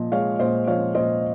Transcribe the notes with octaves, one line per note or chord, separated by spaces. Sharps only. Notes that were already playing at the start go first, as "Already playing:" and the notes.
Already playing: A#2 F3 D#5
G#3 C#5 F5
A#2 C5 D#5
F3 C#5 F5
A#2 C5 D#5